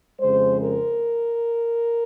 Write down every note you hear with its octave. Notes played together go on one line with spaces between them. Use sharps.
F2 C#3 G#3 C5
A#4